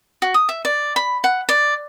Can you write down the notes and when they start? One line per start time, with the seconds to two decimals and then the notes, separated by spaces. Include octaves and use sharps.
0.22 F#4
0.34 D#6
0.49 E5
0.65 D5
0.96 B5
1.24 F#5
1.49 D5